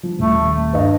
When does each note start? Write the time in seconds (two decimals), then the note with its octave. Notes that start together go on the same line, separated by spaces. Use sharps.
0.03 F3
0.19 D#1 A3
0.73 G2 B4 D#5